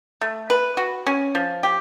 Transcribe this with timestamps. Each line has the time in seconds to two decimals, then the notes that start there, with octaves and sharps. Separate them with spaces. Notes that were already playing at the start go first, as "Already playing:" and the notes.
0.21 A3
0.50 B4
0.77 F#4
1.07 C#4
1.35 F3
1.63 G4